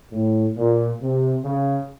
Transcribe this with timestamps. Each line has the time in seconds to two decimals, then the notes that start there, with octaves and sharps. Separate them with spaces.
0.12 A2
0.57 A#2
1.01 C3
1.44 C#3